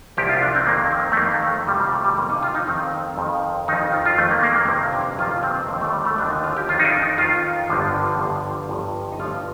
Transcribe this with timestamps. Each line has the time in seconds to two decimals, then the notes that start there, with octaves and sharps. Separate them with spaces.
0.17 C2 A#2 F3 G4
0.29 F4
0.42 D4
0.55 C4
0.67 F2 D#3 A#3
0.91 C4
1.12 A3
1.17 F2 D#3 A#3
1.43 A3
1.67 F2 C3 F3 G3
1.80 G3
1.93 A3
2.05 G3
2.17 F2 C3 F3 A#3
2.29 D#4
2.43 F4
2.55 D#4
2.68 F2 D#3 C4
3.18 F2 D#3
3.68 F2 D#3 D#4
3.92 F4
4.05 F4
4.18 F2 D#3 A3
4.31 A#3
4.43 A#3
4.56 A#3
4.67 G1 F2 C3 D#3 C4
4.93 D4
5.18 G1 F2 C3 D#3 F4
5.43 C4
5.68 D#2 D3 F3 C4
5.81 A3
5.93 G3
6.05 A3
6.18 D#2 D3 F3 D4
6.30 D#4
6.44 F4
6.57 G4
6.69 D#3 F4
6.72 F2
6.79 D#4
6.85 D4
7.02 D#4
7.18 F2 D#3 F4
7.69 G1 G2 D3 F3
8.19 G1 G2 D3 F3
8.69 G1 G2 F3
9.12 D#4
9.19 G1 G2 F3 F4